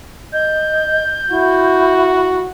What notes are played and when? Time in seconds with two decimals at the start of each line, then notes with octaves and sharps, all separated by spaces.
0.33 D#5 G6
1.30 E4 F#4